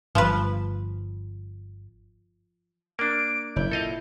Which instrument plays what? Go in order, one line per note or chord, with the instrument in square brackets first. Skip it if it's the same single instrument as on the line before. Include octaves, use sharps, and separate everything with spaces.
[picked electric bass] G1 [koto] F3 B4
[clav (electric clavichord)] A#3 D4 [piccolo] D7
[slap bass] F#1 [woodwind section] E4 [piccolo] G6
[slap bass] A#2 [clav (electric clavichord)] A4 D#5 F5